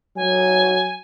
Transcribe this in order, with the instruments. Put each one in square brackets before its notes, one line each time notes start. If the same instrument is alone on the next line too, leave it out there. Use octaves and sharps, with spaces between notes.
[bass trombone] F#3 [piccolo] G#5